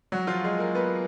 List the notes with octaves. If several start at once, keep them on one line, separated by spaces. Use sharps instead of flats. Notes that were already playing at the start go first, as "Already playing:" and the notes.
F#3 F#4
F3 F4
G#3 G#4
A#3 A#4
B3 B4